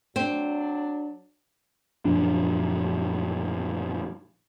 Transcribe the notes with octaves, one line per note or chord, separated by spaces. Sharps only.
F#3 C4 D4
F#2 A#2 F3 D4